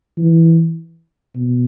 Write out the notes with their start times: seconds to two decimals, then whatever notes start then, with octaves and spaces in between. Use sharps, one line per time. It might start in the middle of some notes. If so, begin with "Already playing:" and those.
0.18 E3
1.36 B2